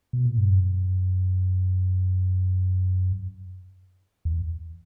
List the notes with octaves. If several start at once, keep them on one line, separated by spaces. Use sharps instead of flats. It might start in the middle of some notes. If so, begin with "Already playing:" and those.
B2
A#2
G2
F#2
E2